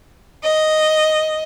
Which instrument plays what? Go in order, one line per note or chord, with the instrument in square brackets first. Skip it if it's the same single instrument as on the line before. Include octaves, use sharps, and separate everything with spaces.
[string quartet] D#5